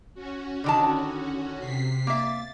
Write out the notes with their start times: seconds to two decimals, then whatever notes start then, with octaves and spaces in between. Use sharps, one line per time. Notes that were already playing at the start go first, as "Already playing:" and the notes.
0.14 C#4 F#4
0.64 D3 D#3 A5
1.59 C3 B6 C7
2.07 A#3 E5 A6